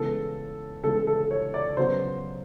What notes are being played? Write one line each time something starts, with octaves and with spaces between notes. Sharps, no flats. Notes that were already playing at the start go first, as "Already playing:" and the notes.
Already playing: C#3 E3 G#3 B3 A4
C#3 E3 G#3 B3 A4
A4
C#5
D5
C#3 F#3 B3 C5